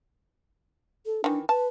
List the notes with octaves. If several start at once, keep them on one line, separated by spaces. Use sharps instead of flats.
A4
D#3 E3 D4
B4 A5